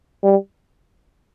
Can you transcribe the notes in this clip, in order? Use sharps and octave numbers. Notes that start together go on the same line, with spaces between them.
G3